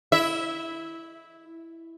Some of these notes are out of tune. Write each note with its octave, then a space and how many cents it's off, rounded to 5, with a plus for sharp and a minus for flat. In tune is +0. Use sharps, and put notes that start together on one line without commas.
E4 +0 E5 -15